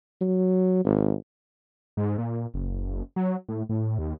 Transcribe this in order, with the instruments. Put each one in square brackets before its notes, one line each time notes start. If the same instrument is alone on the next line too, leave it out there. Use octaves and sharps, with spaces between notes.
[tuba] F#3
G#1
[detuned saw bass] G#2
A#2
F#1
F#3
A2
A2
D#2